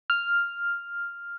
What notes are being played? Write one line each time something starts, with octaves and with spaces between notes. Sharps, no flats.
F6